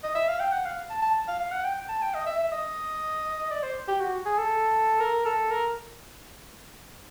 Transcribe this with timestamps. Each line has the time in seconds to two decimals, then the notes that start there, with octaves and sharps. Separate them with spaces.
0.03 D#5
0.15 E5
0.28 F5
0.40 G5
0.52 F#5
0.65 F5
0.90 A5
1.02 A5
1.28 F5
1.40 F5
1.52 F#5
1.64 G5
1.89 A5
2.02 G5
2.14 D#5
2.26 E5
2.39 E5
2.51 D#5
3.51 D5
3.63 C5
3.88 G4
4.00 F#4
4.25 G#4
4.38 A4
5.00 A#4
5.25 A4
5.50 A#4